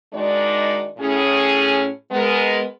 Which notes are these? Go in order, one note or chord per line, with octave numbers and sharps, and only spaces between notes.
D#3 G#3 D4 D#4 F#4 D5
A2 C#4 G#4
G#3 B3 A#4